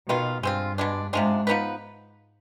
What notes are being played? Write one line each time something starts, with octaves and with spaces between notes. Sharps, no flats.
B2 D#3 B3 F4
G2 G#3 C4 F4
B2 G#3 D4
G#2 C3 F3 G#3 D4
F3 B3 D#4 B4